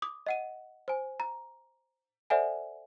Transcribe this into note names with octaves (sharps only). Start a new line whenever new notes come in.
D6 D#6
D#5 F#5 D#7
C5 G#5
A#5
A4 C5 D5 E5 F#5 G#5